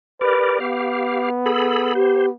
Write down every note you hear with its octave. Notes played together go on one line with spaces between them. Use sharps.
G4 A#4 B4 D5
B3 G4 F5
G#4 A4 B5
G4 C5